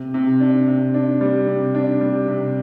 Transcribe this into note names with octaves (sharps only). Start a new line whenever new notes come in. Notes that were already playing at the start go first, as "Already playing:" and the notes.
Already playing: C3
C3
D4
C3
D4
G3
C3
D4
G3
C3